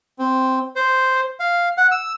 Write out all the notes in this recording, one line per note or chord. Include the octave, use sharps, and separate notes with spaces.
C4
C5
F5
F#5
E6